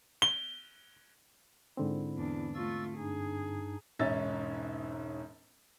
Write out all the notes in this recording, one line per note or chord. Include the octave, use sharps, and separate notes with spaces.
G7
G#2 D3 C4 E4
E2 D4
A3 F4 C#6 E6 A6
G2 D4 D#4 G#4
E1 G#2 C#4 D#4 E5 A6